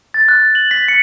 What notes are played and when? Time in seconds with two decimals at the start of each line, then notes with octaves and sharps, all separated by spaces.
0.14 A6
0.28 F#6
0.55 F#7
0.71 B6
0.88 C#7